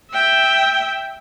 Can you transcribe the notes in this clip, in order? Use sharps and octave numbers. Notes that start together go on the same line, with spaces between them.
E5 G5